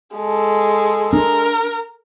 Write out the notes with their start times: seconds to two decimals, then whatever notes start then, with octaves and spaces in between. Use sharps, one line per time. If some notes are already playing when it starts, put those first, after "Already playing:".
0.16 G#3 A4
1.13 D4 A#4